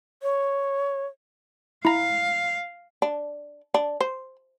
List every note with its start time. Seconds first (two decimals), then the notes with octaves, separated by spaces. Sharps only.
0.22 C#5
1.85 E4 F5 A#5
3.02 D4
3.74 D4
4.01 C5